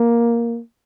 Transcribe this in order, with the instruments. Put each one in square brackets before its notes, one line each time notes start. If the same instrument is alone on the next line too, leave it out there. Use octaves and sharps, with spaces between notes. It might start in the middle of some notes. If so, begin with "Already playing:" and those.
Already playing: [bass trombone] A#3